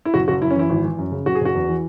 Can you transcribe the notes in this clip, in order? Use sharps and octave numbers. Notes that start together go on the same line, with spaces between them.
E4
F#1 F#4
F#1 F#4
F#2 E4
C#4
E3 E4
G#1
E3
F#2
C#3
F#1 F#4
G#4
F#1 F#4
E2
E3